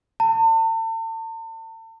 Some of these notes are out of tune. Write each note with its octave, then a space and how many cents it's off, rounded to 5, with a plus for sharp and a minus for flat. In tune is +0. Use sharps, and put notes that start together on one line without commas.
A5 +40